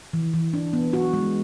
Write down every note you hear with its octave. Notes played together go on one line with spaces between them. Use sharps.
E3
E3
D4
B3
F#4
G#3